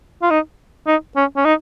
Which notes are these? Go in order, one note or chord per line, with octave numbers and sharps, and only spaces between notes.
F4
D#4
D#4
C#4
C#4
D#4